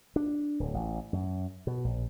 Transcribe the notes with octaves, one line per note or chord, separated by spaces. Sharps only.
D4
D1
A1
F#2
B2
A#1